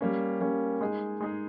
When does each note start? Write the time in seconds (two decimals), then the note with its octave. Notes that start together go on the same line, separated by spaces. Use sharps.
0.01 G3 A#3 C#4
0.41 G3 A#3 C#4
0.81 G#3 D#4 G#4
1.20 G#3 D#4 G#4